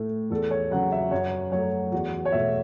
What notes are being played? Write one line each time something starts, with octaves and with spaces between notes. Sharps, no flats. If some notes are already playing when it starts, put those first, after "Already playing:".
Already playing: A2 A3
E2 A4
C#5
C#3 F#3 F#5
E5
F#2 C#5
F#3 A3 C#5
E2 F#4
C#5
B2 A3 E5